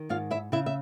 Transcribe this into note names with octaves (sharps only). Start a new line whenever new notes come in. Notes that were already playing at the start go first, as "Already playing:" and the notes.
Already playing: D#3
G#2 F4 F5
E4 E5
C#3 E4 E5
E5